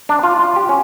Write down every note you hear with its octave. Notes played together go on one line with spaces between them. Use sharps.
D4
F4
F4
G4
C#4